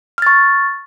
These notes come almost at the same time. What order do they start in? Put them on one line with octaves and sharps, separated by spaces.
F6 A6 C#6